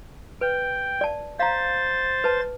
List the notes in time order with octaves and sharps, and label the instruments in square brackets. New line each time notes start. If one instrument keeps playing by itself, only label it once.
[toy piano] B4 [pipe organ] G5
[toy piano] D5 A5
[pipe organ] C5 A6 [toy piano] F5 A#5
[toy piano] B4 A5